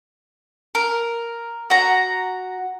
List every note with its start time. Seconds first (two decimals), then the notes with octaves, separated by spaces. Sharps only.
0.75 A#4
1.70 F#4 A#5